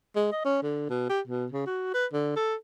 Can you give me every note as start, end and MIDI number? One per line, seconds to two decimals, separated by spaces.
0.16 0.28 56
0.32 0.40 75
0.45 0.60 61
0.63 0.85 50
0.90 1.05 47
1.09 1.20 67
1.27 1.46 47
1.52 1.66 49
1.66 1.91 66
1.94 2.05 71
2.13 2.32 50
2.36 2.55 69